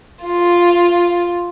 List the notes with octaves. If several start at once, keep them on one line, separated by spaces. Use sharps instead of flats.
F4